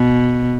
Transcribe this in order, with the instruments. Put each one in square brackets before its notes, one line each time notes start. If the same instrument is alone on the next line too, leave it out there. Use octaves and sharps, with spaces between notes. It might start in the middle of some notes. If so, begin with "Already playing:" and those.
Already playing: [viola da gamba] B2